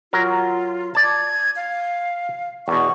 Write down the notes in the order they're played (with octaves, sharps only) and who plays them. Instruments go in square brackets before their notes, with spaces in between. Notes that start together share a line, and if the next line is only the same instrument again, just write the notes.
[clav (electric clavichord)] F#3 A#4 [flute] F4
[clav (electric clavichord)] D5 A5 [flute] G#6
[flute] F5
[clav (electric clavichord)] E2 B2 [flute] C#6